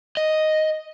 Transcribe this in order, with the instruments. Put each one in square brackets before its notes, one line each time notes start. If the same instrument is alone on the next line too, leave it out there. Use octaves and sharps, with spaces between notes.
[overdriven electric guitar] D#5